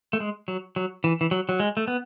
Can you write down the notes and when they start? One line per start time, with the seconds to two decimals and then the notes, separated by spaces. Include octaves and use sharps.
0.13 A3
0.20 G#3
0.48 F#3
0.76 F#3
1.04 E3
1.21 E3
1.31 F#3
1.49 F#3
1.60 G#3
1.77 A3
1.88 B3